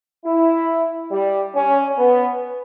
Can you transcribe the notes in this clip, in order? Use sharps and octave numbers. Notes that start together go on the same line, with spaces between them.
E4
G3
C#4
B3